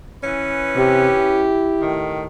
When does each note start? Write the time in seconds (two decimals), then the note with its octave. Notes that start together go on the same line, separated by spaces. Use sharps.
0.24 E3 C#4 B4
0.75 C3 G4
1.17 E4
1.82 A2 D#3